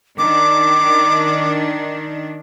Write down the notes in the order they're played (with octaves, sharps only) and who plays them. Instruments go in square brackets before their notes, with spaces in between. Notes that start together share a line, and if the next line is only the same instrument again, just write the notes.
[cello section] D#3 D4 [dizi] D6